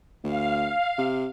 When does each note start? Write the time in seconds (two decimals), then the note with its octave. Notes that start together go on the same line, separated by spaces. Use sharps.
0.24 D2 F5
0.98 C3